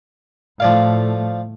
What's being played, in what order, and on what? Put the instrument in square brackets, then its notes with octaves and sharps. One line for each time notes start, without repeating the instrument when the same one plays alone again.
[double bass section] A2 A3 [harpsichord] F3 D5 F5